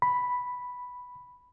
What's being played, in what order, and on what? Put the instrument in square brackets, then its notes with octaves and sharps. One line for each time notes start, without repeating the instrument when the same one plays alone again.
[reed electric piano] B5